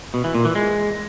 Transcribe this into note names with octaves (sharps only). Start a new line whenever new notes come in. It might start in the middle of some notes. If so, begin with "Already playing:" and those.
B2
E3
A#2
E3
G#3